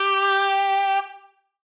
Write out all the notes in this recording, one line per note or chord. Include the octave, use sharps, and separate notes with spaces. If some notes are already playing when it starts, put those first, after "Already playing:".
Already playing: G4